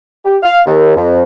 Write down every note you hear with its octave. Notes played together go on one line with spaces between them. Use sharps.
G4
F5
D#2
F2